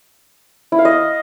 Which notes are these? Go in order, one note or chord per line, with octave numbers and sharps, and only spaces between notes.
E4
F5
D#5